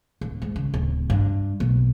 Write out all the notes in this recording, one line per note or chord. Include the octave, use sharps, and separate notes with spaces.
D1
G#2
C#3
D1
G2
B1